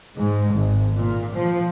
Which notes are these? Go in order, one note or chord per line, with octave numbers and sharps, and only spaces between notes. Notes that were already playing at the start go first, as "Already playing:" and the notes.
G#2
G#1
A#2
F3